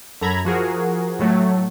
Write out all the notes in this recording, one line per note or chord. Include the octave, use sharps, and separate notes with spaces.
F#2 A4 A#5 B5 G#6
F3 F#4 G#4 A#4
A2 F#3 A3